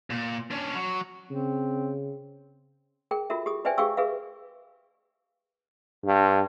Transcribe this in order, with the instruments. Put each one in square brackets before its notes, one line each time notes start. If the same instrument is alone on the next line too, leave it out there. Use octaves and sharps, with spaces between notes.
[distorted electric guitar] A#2
C#4 D4
F#3
[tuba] C#3 [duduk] C4
[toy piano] G#4 A#4 G5
F4 F#4 A4 A#4 E5
G4 G#4 D#6
B4 C5 D5 E5 G5 G#5
G4 G#4 F5 G5 C#6 E6
G#4 A#4 B4 E5 F5
[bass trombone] G2